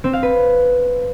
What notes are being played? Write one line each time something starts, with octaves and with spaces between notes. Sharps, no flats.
C4
F5
B4